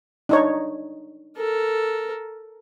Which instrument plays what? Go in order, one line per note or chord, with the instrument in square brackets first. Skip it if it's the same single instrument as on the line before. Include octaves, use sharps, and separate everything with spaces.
[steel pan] D4 D#4 C#5
[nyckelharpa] A4 A#4